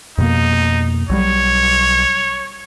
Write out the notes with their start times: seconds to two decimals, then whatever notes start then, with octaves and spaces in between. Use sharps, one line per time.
0.18 F2 B2 A#3 D#4
1.09 B1 F#3 G3 C#5